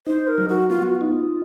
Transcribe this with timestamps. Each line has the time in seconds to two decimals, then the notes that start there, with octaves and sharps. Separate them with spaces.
0.07 D#4 C5
0.27 A#4
0.38 F#3
0.48 F#4
0.69 B3 F4
0.83 F#4
0.95 F4
1.01 D#4